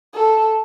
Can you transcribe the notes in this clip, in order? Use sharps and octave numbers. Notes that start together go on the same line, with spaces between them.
A4